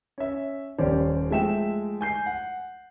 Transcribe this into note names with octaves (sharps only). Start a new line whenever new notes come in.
C#4 E5
D#1 D#2 C#4 C5 D5
F3 G#3 A3 E5 G5 E7
G#5 G6 C7
F#5